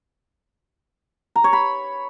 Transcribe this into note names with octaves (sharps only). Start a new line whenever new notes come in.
A#5
C#5
B5